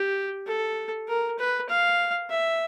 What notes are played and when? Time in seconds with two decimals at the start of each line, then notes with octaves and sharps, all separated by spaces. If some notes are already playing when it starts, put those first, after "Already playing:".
Already playing: G4
0.46 A4
1.08 A#4
1.39 B4
1.69 F5
2.30 E5